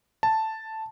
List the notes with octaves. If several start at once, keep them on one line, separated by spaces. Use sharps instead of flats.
A5